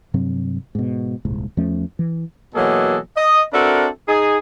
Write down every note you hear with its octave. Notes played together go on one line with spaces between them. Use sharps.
G2 C3 F#3 C4
G#2 B2
D#1 C2 G#2
E2 F3 A3 C#4
E3
B2 E3 F#3 A#3 G#4 A4
D#5
C4 D4 F#4 A4 A#4 E5
D#4 G#4